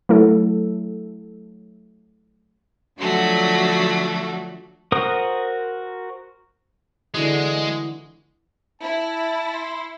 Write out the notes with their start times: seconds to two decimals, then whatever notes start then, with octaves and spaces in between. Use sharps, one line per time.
0.09 F#3 A3 E4 A4
2.99 D3 F3 F#3 A3 F#4
4.92 F#4 A#4 C5 D#6
7.14 D3 E3 G#3 F#4
8.82 E4 A5
9.54 C6